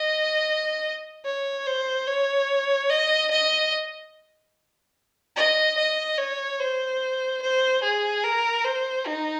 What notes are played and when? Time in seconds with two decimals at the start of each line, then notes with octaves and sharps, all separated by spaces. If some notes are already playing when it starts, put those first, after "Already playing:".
Already playing: D#5
1.25 C#5
1.67 C5
2.07 C#5
2.90 D#5
3.31 D#5
5.36 D#5
5.78 D#5
6.18 C#5
6.60 C5
7.42 C5
7.83 G#4
8.24 A#4
8.65 C5
9.06 D#4